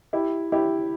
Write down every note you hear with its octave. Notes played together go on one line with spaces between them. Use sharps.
E4 G4
E4 G4